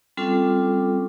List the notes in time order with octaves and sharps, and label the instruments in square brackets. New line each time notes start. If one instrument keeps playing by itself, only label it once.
[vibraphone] G3 C4 C#4 F4 A4 D6